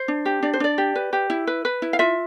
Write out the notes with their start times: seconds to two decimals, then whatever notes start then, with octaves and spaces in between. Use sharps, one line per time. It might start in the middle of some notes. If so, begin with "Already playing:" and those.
Already playing: C5
0.08 D4
0.25 G4
0.43 D4 D5
0.53 C5
0.60 D4 D5
0.78 G4
0.95 B4
1.13 G4
1.30 E4
1.47 B4
1.65 B4
1.82 E4
1.93 F5
1.99 F4 E5